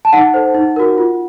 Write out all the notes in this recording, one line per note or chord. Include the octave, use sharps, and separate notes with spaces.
A5
D#4 F#5
A4 C5
D#4
F#4 A#4
F4